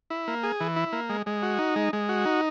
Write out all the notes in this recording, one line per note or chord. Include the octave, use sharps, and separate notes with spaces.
E4
A#3
G#4
E3
E4
A#3
G#3
G#3
F#4
D#4
G#3
G#3
F#4
D#4